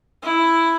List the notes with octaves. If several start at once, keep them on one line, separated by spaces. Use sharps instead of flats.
E4